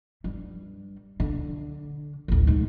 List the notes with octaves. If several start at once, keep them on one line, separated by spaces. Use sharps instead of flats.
G2 G3
D3
A1 D2
G#2 G#3